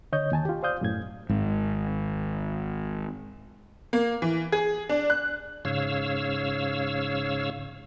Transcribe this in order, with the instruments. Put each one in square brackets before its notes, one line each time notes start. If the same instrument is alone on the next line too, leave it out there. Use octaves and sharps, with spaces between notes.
[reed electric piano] D3 C#5 D#5 G6
D#2 G#5 A5
F4 G4
C5 D5 F5 D#6 G6
F#2 A2 G#6
[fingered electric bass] G#1 G#2
[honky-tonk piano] A#3
E3
G#4
D4
F#6
[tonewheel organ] G#2 C#3 C#5 F5 E6